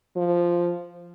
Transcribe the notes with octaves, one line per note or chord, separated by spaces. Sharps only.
F3